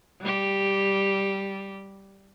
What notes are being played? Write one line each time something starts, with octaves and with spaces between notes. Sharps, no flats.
G3 G4